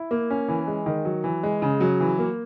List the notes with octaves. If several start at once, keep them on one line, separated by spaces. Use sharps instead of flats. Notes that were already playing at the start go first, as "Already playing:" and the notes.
Already playing: E4
A#3
C#4
E3
G#3
D#3
F#3
E3
G#3
C#3
F#3
E3
A#3